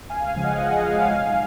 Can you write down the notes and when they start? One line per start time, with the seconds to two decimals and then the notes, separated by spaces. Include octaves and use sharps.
0.10 C#2 F5 G#5
0.27 F5 G#5
0.36 C#3 F3 G#3
0.44 D#5 F#5
0.61 C#2
0.86 C#3 F3 G#3 F5 G#5
1.12 B1